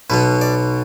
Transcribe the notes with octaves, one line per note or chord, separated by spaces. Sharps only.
B1 B2 B3 B4
D5